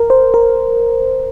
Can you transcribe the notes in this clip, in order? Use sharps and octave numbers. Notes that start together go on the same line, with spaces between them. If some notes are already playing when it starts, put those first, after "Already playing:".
Already playing: A#4
C5
A#4